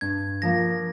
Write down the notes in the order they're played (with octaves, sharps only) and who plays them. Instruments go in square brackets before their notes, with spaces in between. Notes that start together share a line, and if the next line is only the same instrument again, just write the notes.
[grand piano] G2 [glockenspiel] G#6
[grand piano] F3 A#3 [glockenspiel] A#6